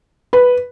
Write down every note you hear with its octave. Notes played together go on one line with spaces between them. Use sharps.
B4